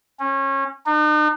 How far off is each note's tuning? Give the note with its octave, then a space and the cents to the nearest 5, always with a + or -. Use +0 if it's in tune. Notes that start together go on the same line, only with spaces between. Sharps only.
C#4 -25
D#4 -45